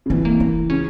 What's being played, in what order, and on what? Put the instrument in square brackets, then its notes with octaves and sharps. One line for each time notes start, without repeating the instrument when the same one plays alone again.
[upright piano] C#3
[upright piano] E3 [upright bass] C4
[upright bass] A#3
E4
[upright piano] C#3 [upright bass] C#4